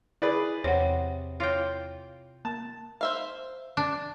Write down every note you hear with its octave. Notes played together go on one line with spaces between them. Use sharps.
E4 G#4 B4 D5
E2 C3 C#5 F#5
E4 F4 C#5 G5
A#3 A5
C5 E5 F5
D4